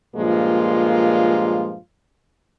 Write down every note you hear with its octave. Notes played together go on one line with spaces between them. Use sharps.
G2 A#2 F3 G#3 A#3 F4